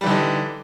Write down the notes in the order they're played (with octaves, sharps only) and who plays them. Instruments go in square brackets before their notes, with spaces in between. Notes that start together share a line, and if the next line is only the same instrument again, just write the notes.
[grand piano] G3
E3
D3
D#4